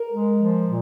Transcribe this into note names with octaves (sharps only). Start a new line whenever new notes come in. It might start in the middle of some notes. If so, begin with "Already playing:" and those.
Already playing: A#4
G#3
F3
A#2